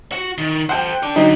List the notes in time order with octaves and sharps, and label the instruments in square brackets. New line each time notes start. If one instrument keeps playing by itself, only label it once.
[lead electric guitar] F#4
D#3
[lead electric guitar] A4 C5 [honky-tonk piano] F#5 G5
[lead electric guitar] A4 D5
[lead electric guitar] D3 [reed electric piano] F#3 D#4